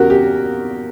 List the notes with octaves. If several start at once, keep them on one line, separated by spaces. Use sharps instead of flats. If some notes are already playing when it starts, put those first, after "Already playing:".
Already playing: E2 C#3 C#4 F#4 G4 A#4
G4